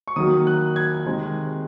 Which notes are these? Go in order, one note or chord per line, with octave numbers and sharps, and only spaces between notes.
C#6
D#3 F#3 A#3 D#6
F#6
G#6
C3 D#3 G#3